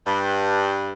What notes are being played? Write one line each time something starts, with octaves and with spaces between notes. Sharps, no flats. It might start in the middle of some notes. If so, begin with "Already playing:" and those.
G2